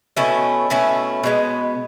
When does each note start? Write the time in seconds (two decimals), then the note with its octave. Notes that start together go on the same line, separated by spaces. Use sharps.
0.17 B2 A3 C#4 E4
0.70 B2 A3 C#4 E4
1.23 B2 G#3 B3